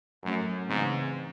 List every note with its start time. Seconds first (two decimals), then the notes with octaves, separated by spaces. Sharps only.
0.24 F#2 A2 F#3 C#4
0.69 G#2 C#3 E3 C4